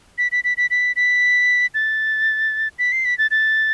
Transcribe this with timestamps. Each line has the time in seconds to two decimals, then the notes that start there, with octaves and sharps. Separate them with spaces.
0.18 B6
0.32 B6
0.44 B6
0.57 B6
0.70 B6
0.96 B6
1.74 A6
2.79 B6
2.92 C7
3.05 B6
3.18 A6
3.31 A6